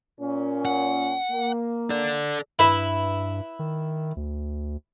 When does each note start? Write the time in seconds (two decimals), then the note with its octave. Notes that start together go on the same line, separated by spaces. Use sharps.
0.21 A#2 C#4
0.65 F#5
1.32 A#3
1.90 A4 D5
2.59 G2 E4 B4 E5
3.59 D#3
4.17 D2